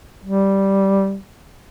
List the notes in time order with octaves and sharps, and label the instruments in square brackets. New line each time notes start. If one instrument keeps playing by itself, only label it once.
[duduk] G3